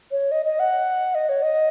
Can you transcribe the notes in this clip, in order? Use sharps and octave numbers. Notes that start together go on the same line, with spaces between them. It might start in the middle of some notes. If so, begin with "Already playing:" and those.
C#5
D#5
D#5
F#5
D#5
C#5
D#5